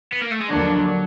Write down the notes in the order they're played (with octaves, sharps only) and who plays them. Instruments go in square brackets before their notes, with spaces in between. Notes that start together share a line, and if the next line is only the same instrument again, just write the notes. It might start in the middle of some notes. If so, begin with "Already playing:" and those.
[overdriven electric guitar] B3
A#3
A3
G#3
[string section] D#2 D3 F3 A#3 D4 [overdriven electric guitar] F#3